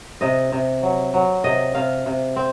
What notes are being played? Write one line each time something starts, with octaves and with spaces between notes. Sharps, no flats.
C3 D#5
C3
F#3
F#3
C3 D#5
C3 F5
C3
C4